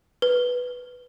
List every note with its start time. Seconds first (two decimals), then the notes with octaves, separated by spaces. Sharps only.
0.22 B4